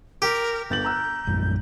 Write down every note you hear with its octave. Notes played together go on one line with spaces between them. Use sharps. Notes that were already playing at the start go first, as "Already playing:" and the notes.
G4 A#4
G1 G6 A6 F#7
A#5 E6 F#6
A#1 F#2 G#3